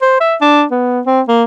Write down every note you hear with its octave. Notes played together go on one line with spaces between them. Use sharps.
C5
E5
D4
B3
C4
A#3